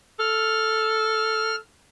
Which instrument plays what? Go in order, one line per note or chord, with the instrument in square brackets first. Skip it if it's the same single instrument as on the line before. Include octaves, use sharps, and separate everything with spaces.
[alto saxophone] A4 [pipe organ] F6